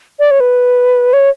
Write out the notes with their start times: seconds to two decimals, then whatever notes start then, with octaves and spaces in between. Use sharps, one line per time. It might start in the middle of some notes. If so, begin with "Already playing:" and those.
0.19 D5
0.31 C#5
0.40 B4
1.13 C#5